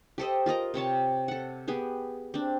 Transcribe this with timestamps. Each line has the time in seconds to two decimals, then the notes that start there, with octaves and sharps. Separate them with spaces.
0.18 G4 A4 C5 D#5
0.46 F4 A#4 D#5 A#5
0.74 C3 C4 C#5 A5
1.28 A4 F#5
1.68 B3 G4 G#4
2.34 C4 D4